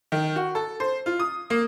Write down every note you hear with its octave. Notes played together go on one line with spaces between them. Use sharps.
D#3
F#4
A4
C5
F4
D#6
A#3